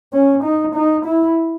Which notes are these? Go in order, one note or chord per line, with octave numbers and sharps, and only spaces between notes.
C#4
D#4
D#4
E4